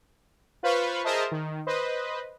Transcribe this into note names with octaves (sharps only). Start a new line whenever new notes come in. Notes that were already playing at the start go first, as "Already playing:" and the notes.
F4 B4 C5 F5 B5 C#6
G#4 A#4 C5 D#5 E5 A5
D#3
B4 C5 D#5